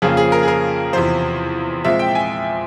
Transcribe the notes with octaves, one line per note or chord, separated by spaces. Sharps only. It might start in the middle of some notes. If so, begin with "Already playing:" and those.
F2 C#3 F3 A#3 G#4
G#4
A#4
G#4
A#4
E2 C3 F3 C5
A#2 F3 G#3 C4 E5
G5
G#5